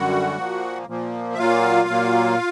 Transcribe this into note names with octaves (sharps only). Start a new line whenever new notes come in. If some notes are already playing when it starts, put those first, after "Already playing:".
Already playing: F#2 D3 G3 F#4 F#5
A#2 F3 A#3
A#2 F3 A#3
E5
A#2 F#3 A#3 F4 F5
A#2 F#3 A#3